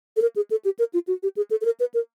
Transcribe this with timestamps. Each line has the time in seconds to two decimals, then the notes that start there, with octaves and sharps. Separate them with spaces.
0.16 A4
0.22 A#4
0.36 G#4
0.50 A4
0.64 G4
0.79 A#4
0.93 F4
1.07 F#4
1.23 G4
1.36 G#4
1.50 A4
1.61 A4
1.65 A#4
1.80 B4
1.94 A#4